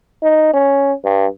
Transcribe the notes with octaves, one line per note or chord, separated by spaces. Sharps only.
D#4
C#4
G2